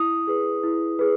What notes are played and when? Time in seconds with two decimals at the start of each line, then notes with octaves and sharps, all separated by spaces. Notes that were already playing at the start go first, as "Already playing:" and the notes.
Already playing: E4 D#6
0.27 G#4 B4
0.63 E4
0.99 G#4 B4